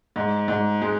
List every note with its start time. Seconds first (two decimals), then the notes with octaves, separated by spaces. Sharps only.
0.16 G#2
0.48 G#2
0.82 G#3